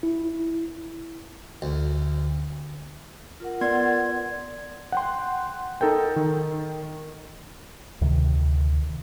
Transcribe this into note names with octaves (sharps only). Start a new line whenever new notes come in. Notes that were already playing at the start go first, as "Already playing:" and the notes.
E4
D2
F4 A#4 F#5
B3 D5 C6 G#6
F#5 G5 C6
D#4 A4 A#4 G5
D#3
D2 C3 D#3